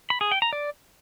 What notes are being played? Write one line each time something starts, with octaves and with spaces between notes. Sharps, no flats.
B5
G#4
G5
A#5
D5